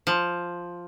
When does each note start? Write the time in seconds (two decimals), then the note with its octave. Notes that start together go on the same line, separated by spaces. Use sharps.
0.07 F3